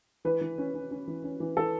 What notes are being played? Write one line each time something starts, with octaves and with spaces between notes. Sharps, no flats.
E3 B4
E3
C#4
C#4
C#4
E3
C#4
E3
E3 A4